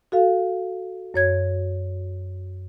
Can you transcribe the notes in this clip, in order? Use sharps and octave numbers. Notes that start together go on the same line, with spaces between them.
F#4 A4 F5
F#2 C#5 G#6